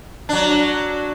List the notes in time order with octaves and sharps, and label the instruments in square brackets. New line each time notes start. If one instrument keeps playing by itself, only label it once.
[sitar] F#3 D4